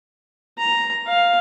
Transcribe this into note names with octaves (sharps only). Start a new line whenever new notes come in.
A#5
F5